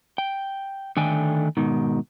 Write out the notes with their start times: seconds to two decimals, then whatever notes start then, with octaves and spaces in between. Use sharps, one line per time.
0.18 G5
0.97 D3 D#3 A3 G5 G#5
1.57 G#2 B2 D#3